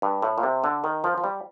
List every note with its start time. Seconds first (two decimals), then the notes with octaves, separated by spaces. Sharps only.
0.02 G2
0.22 A2
0.38 A#2
0.43 C3
0.64 D3
0.84 D#3
1.04 F3
1.18 F3
1.24 G3